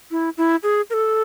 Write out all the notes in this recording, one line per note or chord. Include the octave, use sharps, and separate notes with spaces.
E4
E4
G#4
A#4
A4